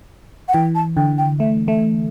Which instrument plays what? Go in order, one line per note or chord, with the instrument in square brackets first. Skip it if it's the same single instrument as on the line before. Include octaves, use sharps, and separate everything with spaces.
[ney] F#5
[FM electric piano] E3 [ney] G5
[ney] A5
[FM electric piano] D3 [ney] G5
[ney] G5
[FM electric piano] A3 [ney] E5
[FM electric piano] A3 [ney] E5